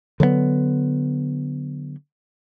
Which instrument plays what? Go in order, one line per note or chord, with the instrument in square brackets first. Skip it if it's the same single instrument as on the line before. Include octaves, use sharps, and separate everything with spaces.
[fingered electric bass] D3 F#3 A3 B3